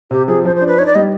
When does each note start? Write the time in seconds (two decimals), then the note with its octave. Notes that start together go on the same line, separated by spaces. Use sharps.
0.11 C3 G4
0.27 F3 G#4
0.45 F3 C5
0.56 C5
0.61 D4
0.68 B4
0.78 D#4 C#5
0.86 D5
0.95 G3 D#5